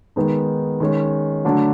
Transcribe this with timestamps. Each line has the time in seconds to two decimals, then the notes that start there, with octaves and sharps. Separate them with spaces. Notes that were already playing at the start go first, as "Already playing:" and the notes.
0.16 D#3 G#3 B3 D#4
0.80 D#3 G#3 C#4
1.45 D3 F#3 A3 D4